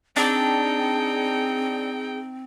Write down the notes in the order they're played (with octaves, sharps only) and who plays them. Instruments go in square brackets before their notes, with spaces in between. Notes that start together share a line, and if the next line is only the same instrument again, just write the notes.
[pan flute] C4 [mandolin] D4 [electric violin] D#4 G5 [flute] G#4